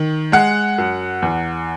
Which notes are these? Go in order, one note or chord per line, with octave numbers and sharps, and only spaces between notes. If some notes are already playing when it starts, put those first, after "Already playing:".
Already playing: D#3
G#3 F#5
F#2
E2